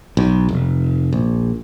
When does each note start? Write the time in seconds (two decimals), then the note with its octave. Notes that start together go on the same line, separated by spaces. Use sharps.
0.17 B1
0.49 F1
1.13 A#1